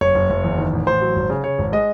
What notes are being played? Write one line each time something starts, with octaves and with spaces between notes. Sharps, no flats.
F#1 C#5
F#1
F#1
E2
D#3
A1
A1 C5
F#3
G#1
C#3
C#3 C#5
G#1
G#3 D#5